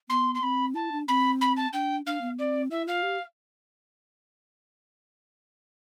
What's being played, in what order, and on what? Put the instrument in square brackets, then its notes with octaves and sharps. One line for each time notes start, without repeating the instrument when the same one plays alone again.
[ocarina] B3 [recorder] C6
[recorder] C6
[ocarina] C4 [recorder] B5
[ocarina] E4 [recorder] A5
[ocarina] D4
[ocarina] C4 [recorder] B5
[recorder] B5
A5
[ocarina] D4 [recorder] G5
[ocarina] D4 [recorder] F5
[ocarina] B3
[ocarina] C4 [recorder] D5
[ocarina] E4 [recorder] E5
[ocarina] F4 [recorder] F5
[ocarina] G4